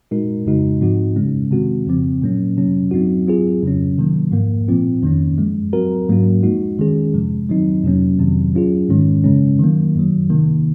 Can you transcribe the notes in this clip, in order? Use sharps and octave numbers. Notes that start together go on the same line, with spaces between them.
A#2 G#3 D#4 F#4 A#4
F2 C#3 G#3 D#4 F#4
G#2 F3 C4 D#4 F#4
F#2 C#3 G#3 C#4
C3 D#3 G#3 C4 F#4
F2 C#3 F3 C4
A#2 F#3 A#3 C#4
C3 F#3 C#4
F#3 C4 D#4 F#4
F#3 C4 F4 G#4
F2 C#3 F#3 C#4
C3 D#3 F#3 A#3
G#2 F3 A#3
A#2 F3 C4 F4
F2 D#3 A#3 C#4
F#2 F3 G#3
F#3 C4 F#4 A#4
G#2 F#3 A#3 C#4 F#4
F3 G#3 D#4 F#4
D#3 G#3 C#4 G#4
F2 C3 F3 G#3
D#3 F#3 C4 D#4
F2 C3 F#3 A#3 C#4
F2 C3 D#3 F#3 C4
F#3 C#4 F4 G#4
G#2 D#3 G#3 C#4
F#2 C#3 G#3 C#4
D#3 F#3 A#3
F#2 D#3 F#3
C3 D#3 A#3